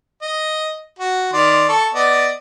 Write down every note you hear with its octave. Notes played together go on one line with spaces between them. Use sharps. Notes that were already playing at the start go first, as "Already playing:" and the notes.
D#5
F#4
D#3 D5 C6
A4 C#6
B3 D5 D#5